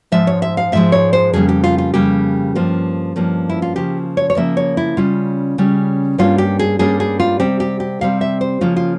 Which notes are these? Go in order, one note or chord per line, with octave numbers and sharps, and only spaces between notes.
G#2 F3 G#3 E5
C#5
E5
F5
G#2 F3 G#3 E5
C#5
C5
F2 C#3 G3 A#3 G#4
G4
F4
F4
F2 C#3 G3 A#3 G4
G2 F3 A#3 C#4
G2 F3 A#3 C#4
E4
F4
C#3 F3 A#3 G4
C#5
C#5
C#3 F3 A#3 E5
C#5
E4
C#3 G3 C#4 F4
C#3 G3 C#4
G2 G3 A#3 C#4 F4
G4
G#4
G2 G3 A#3 C#4 G#4
G#4
F4
C3 G3 C4 G4
G4
G4
C3 G3 C4 F5
E5
C5
C#3 F3 A#3 C#4 F4
F4